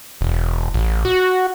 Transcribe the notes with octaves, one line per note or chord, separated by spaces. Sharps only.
E1
A1
F#4